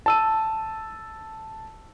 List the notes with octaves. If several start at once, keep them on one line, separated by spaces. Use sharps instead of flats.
A5 E6 D#7